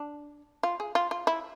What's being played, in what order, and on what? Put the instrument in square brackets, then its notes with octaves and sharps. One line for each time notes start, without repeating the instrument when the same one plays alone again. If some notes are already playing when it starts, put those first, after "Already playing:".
Already playing: [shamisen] D4
F4
G#4
F4
F4
E4